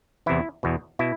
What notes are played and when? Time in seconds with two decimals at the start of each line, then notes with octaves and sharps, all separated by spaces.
0.26 E2 C3 E3 E4
0.63 E2 B2
0.99 B2 E4